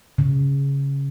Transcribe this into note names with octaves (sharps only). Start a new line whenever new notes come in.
C#3